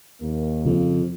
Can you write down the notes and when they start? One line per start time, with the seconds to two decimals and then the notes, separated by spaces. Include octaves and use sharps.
0.22 D#2 A#3
0.65 F2 C#3 F3